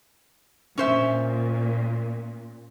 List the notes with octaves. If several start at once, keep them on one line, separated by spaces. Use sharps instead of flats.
A#2 C#4 C5 E5